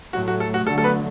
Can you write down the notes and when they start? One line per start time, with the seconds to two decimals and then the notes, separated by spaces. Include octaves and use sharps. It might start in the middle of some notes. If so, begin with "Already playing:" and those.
0.13 A2 F#3 A3 F#4
0.28 F#4
0.40 A4
0.54 F#4
0.66 D3 F#3 A3 A4
0.78 A4
0.84 B3 B4